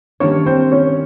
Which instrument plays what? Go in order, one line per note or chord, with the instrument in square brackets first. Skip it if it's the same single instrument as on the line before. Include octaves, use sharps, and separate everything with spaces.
[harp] D#3 G3 A#3 D4 [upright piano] C#4 C#5
[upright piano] C4 C5
C#4 C#5